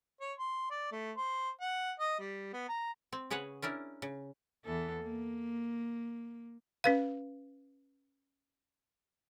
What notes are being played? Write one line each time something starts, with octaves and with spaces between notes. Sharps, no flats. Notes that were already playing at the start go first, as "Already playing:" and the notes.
C#5
C6
D5
A3
C5
F#5
D#5
G3
B3
A#5
C4
C#3 G#4 B4 C#5 F#5
C#4 D4 E4 A#4
C#3
E2 E3 A4
A#3
C#4 B4 F5